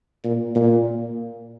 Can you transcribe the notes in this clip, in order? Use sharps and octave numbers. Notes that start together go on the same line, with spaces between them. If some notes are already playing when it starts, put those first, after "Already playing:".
A#2
A#2